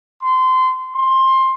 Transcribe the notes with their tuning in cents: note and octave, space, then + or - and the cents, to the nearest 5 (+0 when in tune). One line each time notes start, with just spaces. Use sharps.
C6 -25
C6 +15